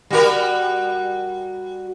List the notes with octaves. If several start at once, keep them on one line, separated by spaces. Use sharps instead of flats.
G3 F#4 A#4